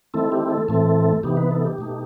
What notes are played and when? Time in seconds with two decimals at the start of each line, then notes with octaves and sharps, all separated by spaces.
0.14 D#3 A3 C4 E4 A4
0.32 G4
0.50 A4
0.69 A2 E3 A3 C4 A4
1.23 C3 E3 B3 D#4 G4
1.37 B4
1.51 A4
1.65 G4
1.78 B2 A3 D#4